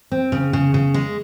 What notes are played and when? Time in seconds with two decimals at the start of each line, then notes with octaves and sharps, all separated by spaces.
0.12 C4
0.32 C#3
0.53 C#3
0.74 C#3
0.94 G#3